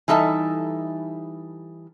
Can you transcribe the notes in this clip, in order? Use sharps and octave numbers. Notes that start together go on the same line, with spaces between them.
E3 G3 D#4 A4 E5 A5